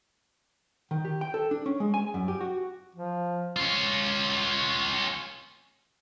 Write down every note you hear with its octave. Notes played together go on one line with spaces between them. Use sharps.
D#3
G4
G5
A4
D4
C#4
G#3
G#5
F#2
G4
F#4
F3
C#4 F4